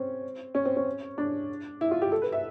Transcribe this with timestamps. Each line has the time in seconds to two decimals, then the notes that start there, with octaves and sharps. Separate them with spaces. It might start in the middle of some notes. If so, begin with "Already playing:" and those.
Already playing: C4 C#4
0.55 C#4
0.65 C4
0.76 C#4
1.18 D4
1.81 E4
1.91 F4
2.02 G4
2.12 A4
2.22 B4
2.32 E5